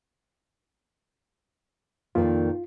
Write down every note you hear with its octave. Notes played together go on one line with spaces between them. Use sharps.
F2 A#2 D#3 F4